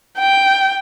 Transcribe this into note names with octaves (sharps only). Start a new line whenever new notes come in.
G5